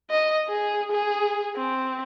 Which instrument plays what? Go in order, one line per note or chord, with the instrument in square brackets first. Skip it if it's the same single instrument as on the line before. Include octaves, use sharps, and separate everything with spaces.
[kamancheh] D#5
G#4
G#4
C4